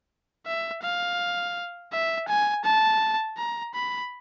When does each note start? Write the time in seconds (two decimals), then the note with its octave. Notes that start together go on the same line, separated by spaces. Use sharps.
0.47 E5
0.83 F5
1.93 E5
2.29 G#5
2.65 A5
3.38 A#5
3.75 B5